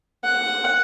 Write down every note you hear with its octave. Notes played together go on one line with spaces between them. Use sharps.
F#5